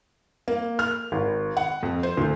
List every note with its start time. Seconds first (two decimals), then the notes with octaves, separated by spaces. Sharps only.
0.48 A#3
0.79 F6
1.12 G#1
1.57 F#5
1.83 F2
2.03 C5
2.17 D2